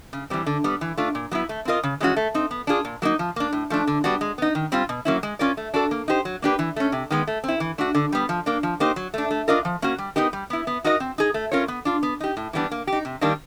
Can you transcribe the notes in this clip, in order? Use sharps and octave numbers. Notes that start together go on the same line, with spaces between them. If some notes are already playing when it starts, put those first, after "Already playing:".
C#3
E3 G3 C4
D3
G3 B3
E3
A3 D4 F4
A#2
F#3 B3 E4
A3
C4 F4 A#4 D#5
C#3
E3 G#3 C#4 F#4
A3
C4 D#4
B3
D4 F4 G#4
A#2
F#3 A#3 D#4
F3
A#3 D4
A2
F3 A3 D4
D3
G3 B3 D4 F#4
G#3
B3 D#4
D#3
G3 C4 F4
B2
F#3 A#3 C#4 E4
G#3
C#4 F4 A#4 D5
A3
D4 F#4 A4
A#3
D#4 G4 C5
F#3
A#3 D4 G4 B4
E3
A3 C#4
C3
D#3 G#3 B3
A3
C4 E4
E3
A3 D4 F#4
D3
G3 B3
F3
A#3 D4
F3
A#3 D#4 G4 C5
F#3
A3 D4
A3
D4 F4 A#4 D#5
F3
A#3 C#4 F#4
G3
B3 D#4 G4 A#4
G3
B3 E4
B3
D#4 F#4 A#4 D#5
C4
D#4 G#4
A3
C#4 F4 A#4 C#5
B3
D4 F4
B3
D#4 G4
A2
E3 G3 B3 D4
A#3
G4
D#4
C3
D#3 G3 A#3 D4